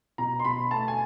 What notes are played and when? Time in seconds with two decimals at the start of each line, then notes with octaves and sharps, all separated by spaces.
0.18 B2 A#5
0.40 C6
0.45 B2 B5
0.71 A3 A5
0.88 G#5